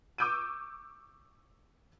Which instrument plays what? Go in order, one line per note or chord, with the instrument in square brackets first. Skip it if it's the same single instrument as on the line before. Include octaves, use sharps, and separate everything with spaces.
[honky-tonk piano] C#6 D6 E6 G6 D7 D#7